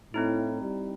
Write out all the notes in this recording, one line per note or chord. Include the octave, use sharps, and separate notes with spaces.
A2 C4 D#4 E4
G3